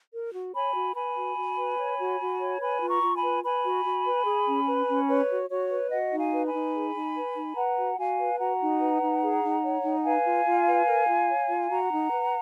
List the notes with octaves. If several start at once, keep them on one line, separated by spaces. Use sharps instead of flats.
A#4
F#4
C#5 G#5 B5
F#4
B4 G#5 B5
F#4
F#4
B4
C#5
F#4
F#4
C#5
B4 G#5 B5
F4
A#5 C#6
F4
G#5 B5
B4
B4 G#5 B5
F#4
F#4
B4
G#4
C#4
B4
C#4
B4 C#5
F#4
F#4 C#5
B4
F#4 D#5 F#5
D#4
F5 G#5
B4
G#5 B5
D#4
G#4
D#4
B4
D#4
B4 F#5 A#5
F#4
F#4 F5 G#5
B4
F#4 F#5 A#5
D#4
B4
D#4
G#4
D#4
C#5
D#4
B4 F5 G#5
F4
F4
B4
A#4
F4
C#5
F4
F#4 F#5 A#5
D#4
B4